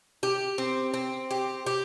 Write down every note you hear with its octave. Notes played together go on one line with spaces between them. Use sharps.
G4
C4
C4
G4
G4